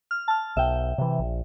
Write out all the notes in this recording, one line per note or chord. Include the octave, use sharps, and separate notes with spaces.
F6
A5 F6
B1 E5 G5
C3 E3
A#1